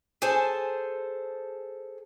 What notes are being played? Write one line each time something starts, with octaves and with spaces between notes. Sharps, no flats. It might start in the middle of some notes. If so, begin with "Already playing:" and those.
G#4 A4 C5 G#5 A5